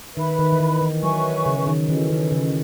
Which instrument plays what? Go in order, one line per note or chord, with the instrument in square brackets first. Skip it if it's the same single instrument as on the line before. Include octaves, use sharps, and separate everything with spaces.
[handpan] D#3 [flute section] B4 E5 B5
[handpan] D#3
E3
D#3
E3
[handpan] F#3 [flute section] B4 E5 G#5 C#6
[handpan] C#3
D#3
[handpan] E3 [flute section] C#4 F#4 A4 D#5
[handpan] D#3
C#3